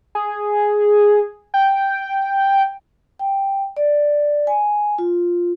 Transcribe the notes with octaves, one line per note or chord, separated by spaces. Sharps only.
G#4
G5
G5
D5
G#5
F4